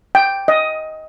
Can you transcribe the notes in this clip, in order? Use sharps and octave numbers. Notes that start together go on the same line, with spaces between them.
G5
D#5